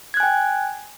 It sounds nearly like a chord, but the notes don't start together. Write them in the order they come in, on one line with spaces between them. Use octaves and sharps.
G#6 F#6 G#5 G5